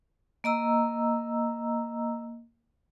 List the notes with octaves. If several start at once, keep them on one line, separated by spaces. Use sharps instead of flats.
A#3 D#5 A#5 E6